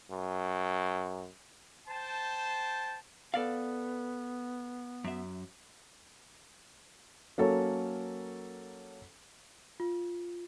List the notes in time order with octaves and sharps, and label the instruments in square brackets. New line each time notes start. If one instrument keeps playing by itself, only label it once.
[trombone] F#2
[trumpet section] C5 G5 A5
[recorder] B3 [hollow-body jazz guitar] A4 D5 F5
[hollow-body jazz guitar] F#2 E5
[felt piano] F#3 A#3 C#4 A4 A#4 C#5
[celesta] F4